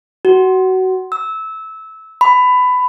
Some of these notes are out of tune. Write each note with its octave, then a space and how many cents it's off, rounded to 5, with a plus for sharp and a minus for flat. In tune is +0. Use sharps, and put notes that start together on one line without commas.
F#4 +20
E6 -20
B5 +20